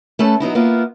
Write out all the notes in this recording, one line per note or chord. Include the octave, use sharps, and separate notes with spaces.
A3 C#4 A4 B4 A5
F#3 B3 D#4 E4
A#3 B3 E4 F4